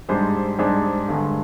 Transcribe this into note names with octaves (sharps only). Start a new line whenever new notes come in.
G#2 G3 D4 G#4 C5
G#2 G3 D4 G#4 C5
G2 D3 G#3